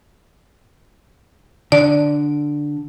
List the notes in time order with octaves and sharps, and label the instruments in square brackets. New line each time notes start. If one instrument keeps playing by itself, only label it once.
[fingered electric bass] D3 [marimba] D5